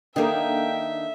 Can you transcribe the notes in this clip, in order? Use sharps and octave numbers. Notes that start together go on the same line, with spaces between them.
D#3 A#3 D4 A4 E5 G5